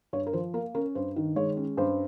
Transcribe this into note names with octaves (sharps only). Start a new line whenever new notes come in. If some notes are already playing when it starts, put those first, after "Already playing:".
G2 C#5
A#4
F3 C5
A#3 A#4
C#4 A#4
G2 C5
D#3
G#3 C#5
C#4
G2 C5